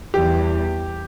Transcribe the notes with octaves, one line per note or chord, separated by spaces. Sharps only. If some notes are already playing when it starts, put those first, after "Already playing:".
E2 E3 G3 G4